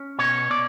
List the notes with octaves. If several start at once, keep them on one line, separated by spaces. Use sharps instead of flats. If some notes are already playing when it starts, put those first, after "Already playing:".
Already playing: C#4
B2 C#5
B2 D5